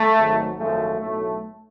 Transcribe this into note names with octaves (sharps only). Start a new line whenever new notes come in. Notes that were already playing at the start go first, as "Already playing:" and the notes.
Already playing: A3
G#1 G#2 F#3
G#1 F#2 F3 G#3 A3
B1 A2 F#3 A3